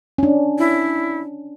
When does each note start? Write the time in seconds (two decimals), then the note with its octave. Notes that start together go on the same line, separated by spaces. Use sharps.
0.18 C#4 D4
0.59 E4